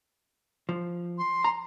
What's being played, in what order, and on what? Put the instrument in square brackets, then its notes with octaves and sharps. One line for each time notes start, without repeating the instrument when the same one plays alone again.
[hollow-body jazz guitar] F3
[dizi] C6
[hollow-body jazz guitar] A#5